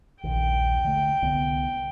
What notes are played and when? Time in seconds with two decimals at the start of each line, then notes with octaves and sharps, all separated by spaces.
0.23 A#1 D#2 G5
0.84 D3 A3
1.22 C2 D3 B3